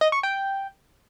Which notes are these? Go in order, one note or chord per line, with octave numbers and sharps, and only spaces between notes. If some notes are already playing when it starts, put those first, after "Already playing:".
D#5
C#6
G5